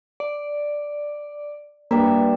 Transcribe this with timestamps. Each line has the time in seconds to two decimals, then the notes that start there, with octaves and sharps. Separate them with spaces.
0.20 D5
1.91 G2 G3 A#3 E5